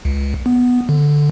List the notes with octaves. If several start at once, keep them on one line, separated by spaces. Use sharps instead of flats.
C#2
B3
D3